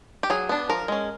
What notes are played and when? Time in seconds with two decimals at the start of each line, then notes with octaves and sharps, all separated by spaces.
0.23 G4
0.30 F#3 G#4
0.49 B3 D4
0.69 F3 A#4
0.88 G#3 C#4